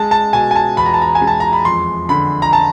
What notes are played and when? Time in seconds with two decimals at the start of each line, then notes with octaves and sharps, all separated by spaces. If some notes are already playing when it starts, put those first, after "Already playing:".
Already playing: G#3 A5
0.11 A5
0.33 B2 G#5
0.51 G#5
0.56 A5
0.77 E2 B5
0.86 A#5
0.94 A5
1.01 A#5
1.15 G#5
1.21 G#3
1.27 A5
1.40 A#5
1.53 B5
1.65 F2 C6
2.09 D3 B5
2.42 A#5
2.53 A5